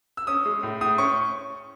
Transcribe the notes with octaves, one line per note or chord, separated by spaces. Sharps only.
E6
C#4 D#6
G#3
A2
A2 D#6
C#4 C#6